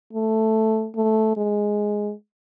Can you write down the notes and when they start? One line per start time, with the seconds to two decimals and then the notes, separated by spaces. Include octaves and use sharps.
0.13 A3
0.96 A3
1.37 G#3